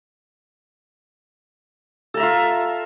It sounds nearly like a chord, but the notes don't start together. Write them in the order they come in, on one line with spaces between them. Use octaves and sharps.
A4 A#5 E5 F4